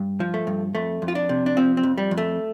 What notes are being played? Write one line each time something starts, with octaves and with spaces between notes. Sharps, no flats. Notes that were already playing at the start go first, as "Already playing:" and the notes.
Already playing: G2
F3
A3
G2
F2 A3
F2
F4
D4
C3
D4
F3 C4
C4
F2
G3
F2
A3